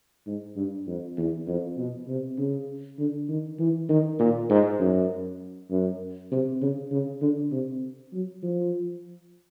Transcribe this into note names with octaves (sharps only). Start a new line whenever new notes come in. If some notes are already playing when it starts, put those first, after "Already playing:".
G#2
G2
F2
E2
F2
B2
C3
C#3
D3
D#3
E3
D#3
A#2
G#2
F#2
F#2
C3
C#3
C#3
D3
C3
F#3
F3